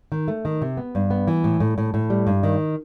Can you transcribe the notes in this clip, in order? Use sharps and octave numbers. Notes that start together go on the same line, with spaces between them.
D#3
A3
D#3
C3
B3
G2
B3
E3
A2
A2
A2
A2
G3
G2
D#3